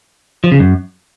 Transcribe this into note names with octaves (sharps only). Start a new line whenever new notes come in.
F3
C#3
F#2